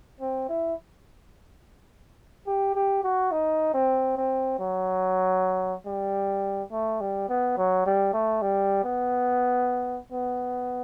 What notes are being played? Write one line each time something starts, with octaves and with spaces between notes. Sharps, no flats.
C4
E4
G4
G4
F#4
D#4
C4
C4
F#3
G3
A3
G3
B3
F#3
G3
A3
G3
B3
B3